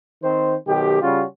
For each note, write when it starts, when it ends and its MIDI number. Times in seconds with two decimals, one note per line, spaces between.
0.23 0.54 51
0.23 0.54 60
0.23 0.54 72
0.67 1.01 35
0.67 1.01 51
0.67 1.01 67
1.02 1.23 49
1.02 1.23 55
1.02 1.23 61
1.02 1.23 65
1.02 1.23 66